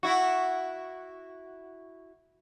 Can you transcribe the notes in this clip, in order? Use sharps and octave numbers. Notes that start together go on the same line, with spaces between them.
E4 F#4